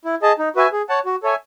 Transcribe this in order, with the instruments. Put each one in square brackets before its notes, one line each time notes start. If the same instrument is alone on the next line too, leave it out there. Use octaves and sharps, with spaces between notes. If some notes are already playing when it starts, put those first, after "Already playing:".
[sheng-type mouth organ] E4
G#4 D#5 A5
D#4
F#4 B4 E5 G#5
G#4
C#5 F#5 A5
F#4
A4 C#5 E5 G#5